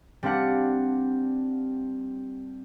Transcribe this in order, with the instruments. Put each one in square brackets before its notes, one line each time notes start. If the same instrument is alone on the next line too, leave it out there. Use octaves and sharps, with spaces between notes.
[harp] G3 C4 D4 F5 F#5